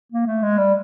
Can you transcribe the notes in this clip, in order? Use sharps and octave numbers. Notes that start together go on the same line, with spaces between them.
A#3
A3
G#3
G3